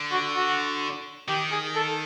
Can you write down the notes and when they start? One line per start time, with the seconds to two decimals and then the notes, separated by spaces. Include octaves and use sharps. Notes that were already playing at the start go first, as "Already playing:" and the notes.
Already playing: D3
0.11 F#4
0.34 F#4
1.28 D#3 G4
1.51 G#4
1.75 A4